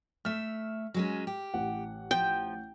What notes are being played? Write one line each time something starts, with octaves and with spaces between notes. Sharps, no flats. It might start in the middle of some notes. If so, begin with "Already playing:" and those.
A3 E5 F6
F#3 G#3 C#4
G4
A1 F#5
F3 G5